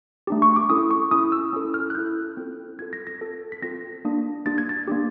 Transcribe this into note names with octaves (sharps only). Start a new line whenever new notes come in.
A3 D4 G4
C#6
D6
C#4 E4 A4 D#6
C#6
C#4 E4 A4 D#6
E6
C#4 E4 A4
F6
F#6
C#4 E4 A4 G6
C4 F4 A4
C4 F4 A4 G#6
A#6
A#6
C4 F4 A4
B6
C4 F4 A4 A#6
A#3 D4 G4
A#3 D4 G4 A6
G#6
A6
A#3 D4 G4